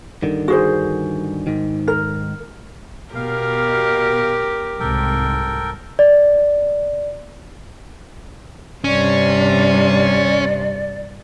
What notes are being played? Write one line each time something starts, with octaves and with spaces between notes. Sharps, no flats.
G2 D3 D#3
F#4 G#4 C5
G#2 D#3
A#4
B2 G4 A#4 F5
C2 G#2 C3 A4 A#4 G5
D5
G2 C3 C#4 D5